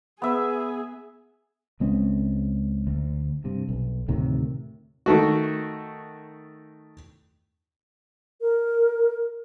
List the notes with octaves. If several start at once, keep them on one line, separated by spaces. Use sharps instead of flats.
B3 G#4 E5
C#2 G#3 C4 C#4
D2
G2 C3
B1
D2 A2 C3 D#3
D#3 A3 F#4
A#4